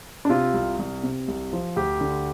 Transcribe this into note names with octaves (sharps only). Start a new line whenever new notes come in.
D4
C3 F4
C2
C2
C3
C2
F3
D2 G4
D3